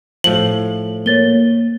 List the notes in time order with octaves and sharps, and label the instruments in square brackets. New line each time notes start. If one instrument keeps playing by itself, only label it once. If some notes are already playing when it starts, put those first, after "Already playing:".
[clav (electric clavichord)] A2 F3 [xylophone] F#7
[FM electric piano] A#3 [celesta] C#5 A6 G7